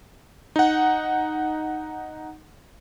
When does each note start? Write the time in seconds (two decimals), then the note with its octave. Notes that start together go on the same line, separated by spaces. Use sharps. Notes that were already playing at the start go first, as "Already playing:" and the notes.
0.56 D#4 F#5